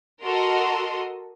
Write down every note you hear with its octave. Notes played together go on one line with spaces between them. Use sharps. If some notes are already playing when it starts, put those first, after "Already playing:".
F#4 A4 A#4 D#5 C6